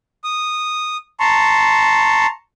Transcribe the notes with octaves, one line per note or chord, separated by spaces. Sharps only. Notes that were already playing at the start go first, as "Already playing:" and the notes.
D#6
A5 A#5 C6 C#6